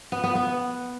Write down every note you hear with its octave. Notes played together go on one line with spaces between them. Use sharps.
B3
B3
B3